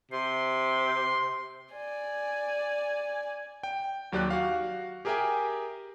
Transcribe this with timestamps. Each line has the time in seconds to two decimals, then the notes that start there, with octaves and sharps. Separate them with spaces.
0.12 C3 C6
1.73 D5 G#5
3.63 G5
4.12 D#2 F#3 G4 D5 F#6
4.30 F#4 F5
5.05 G4 G#4 A#4 E5 G5 G#5